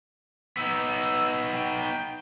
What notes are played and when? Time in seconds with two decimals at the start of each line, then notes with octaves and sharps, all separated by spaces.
0.57 B3 D#4 E6
1.53 G5